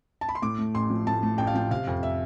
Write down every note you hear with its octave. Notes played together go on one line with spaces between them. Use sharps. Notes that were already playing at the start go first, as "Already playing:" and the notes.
A5
B5
C6
A2 D6
A3
A1 C6
F3
A2 A5
A3
A1 G5
F5
F3 G5
C3 F5
F2
E5